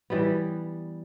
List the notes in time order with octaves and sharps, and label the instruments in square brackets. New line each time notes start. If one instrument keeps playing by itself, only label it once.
[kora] E3 G3 B3